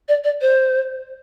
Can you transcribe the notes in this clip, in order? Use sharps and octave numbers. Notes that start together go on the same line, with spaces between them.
D5
D5
C5